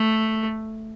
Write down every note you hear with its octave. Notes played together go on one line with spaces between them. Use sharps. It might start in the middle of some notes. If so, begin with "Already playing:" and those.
Already playing: A3